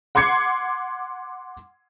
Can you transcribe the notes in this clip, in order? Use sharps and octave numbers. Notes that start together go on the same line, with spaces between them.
F#5 C6 D6 G#6 C7 C#7